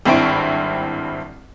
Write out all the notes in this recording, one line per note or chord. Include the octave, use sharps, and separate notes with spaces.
G#1 G2 C4 E4 C#6 D7